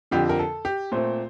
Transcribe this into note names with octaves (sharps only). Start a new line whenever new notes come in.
F2 D3 F3 G4
A#4
A4
G4
A#2 A3 C4 C5